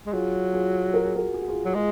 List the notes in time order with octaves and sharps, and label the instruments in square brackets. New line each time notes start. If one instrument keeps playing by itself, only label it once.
[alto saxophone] G#3
[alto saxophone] F#3 [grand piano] F4 G#4
[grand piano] F4 G#4
A#4
G#4
F#4 A#4
G#4
F#4
F4 G#4
[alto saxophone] F#3
[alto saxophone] G#3 [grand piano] F4 G#4